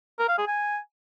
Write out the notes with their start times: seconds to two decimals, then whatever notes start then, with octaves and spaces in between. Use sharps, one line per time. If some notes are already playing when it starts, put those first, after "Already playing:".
0.19 A#4
0.29 F5
0.38 G#4
0.48 G#5